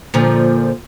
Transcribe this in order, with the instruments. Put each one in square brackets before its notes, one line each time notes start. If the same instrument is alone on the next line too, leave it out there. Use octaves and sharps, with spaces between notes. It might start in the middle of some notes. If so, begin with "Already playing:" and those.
[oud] A#2 D3 F3